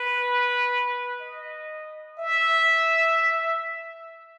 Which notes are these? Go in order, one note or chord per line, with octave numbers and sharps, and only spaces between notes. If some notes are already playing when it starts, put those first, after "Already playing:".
Already playing: B4
D#5
E5